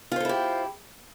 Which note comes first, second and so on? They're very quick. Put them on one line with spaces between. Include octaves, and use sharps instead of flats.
F4 C5 A4 E4 G4